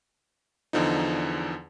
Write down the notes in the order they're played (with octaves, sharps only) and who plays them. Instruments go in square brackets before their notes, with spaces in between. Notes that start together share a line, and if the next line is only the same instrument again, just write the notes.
[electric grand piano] E2 D3 F3 D#4